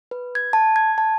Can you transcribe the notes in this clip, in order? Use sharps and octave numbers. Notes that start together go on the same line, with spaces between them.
B4
G#6
A5
G#6
A5